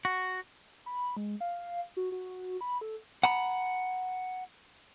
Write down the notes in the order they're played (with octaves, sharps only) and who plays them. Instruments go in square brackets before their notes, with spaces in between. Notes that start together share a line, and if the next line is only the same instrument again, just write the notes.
[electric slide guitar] F#4
[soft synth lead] B5
G#3
F5
F#4
F#4
B5
A4
[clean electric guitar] F#5 A#5 B5